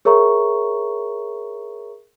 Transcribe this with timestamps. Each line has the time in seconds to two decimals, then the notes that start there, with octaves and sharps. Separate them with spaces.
0.05 G#4 A#4 C#5 E5 A#5 C#6